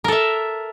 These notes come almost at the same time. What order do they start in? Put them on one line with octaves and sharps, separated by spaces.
A#4 A4 E5